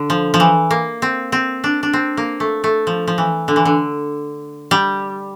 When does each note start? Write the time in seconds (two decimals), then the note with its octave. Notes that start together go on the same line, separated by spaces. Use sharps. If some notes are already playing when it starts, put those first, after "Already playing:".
Already playing: D3
0.10 F3
0.34 F3
0.40 E3
0.71 A#3
1.02 C4
1.32 C4
1.64 D4
1.83 D4
1.93 C4
2.17 A#3
2.40 A3
2.64 A3
2.87 F3
3.08 F3
3.18 E3
3.48 D3
3.56 E3
3.65 D3
4.71 G3